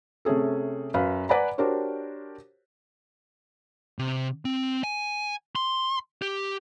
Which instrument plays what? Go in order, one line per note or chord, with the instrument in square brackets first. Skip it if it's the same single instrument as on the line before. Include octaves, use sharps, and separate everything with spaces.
[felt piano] C3 A3 C#4 G#4 A4
F#2 B4 F5 B5
B4 D5 F#5 G#5 A#5 B5
D4 F#4 G4 A#4 C5 C#5
[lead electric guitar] C3
C4
G#5
C6
G4